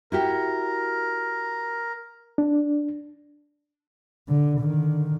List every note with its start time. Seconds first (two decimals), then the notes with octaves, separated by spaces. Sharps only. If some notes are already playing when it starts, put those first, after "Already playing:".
0.12 E4 F#4 G4 A#4
2.38 D4
4.28 D3
4.60 D3 D#3